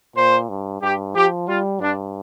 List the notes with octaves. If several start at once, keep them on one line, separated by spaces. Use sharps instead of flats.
A#2 C5
G2
G2 G4
F3 G4
G3 F4
G2 D4